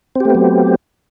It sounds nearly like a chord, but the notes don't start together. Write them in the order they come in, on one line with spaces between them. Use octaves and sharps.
C4 G4 A3 B3 F#3